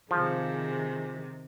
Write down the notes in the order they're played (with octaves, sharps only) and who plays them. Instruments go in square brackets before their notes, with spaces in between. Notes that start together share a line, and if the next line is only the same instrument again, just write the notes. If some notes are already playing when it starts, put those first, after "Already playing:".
[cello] C3 D#3 [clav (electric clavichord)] F3 [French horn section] G#4